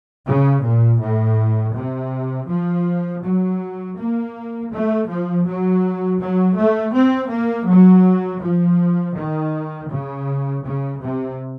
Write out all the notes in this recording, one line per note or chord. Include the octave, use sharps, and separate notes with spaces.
C#3
A#2
A2
C3
F3
F#3
A#3
A3
F3
F#3
F#3
A3
C4
A#3
F#3
F3
D#3
C#3
C#3
C3